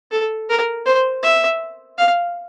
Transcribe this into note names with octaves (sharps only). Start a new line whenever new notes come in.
A4
A#4
C5
E5
F5